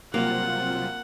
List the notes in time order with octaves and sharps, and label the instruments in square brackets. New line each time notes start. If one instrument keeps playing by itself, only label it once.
[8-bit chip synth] C3 F#3 G3 [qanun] A#3 [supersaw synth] C4 F4 [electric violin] F#5